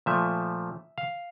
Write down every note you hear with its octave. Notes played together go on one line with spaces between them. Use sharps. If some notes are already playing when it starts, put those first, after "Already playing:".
A#2 F3 A3 E5
F5